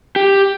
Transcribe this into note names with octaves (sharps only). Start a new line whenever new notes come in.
G4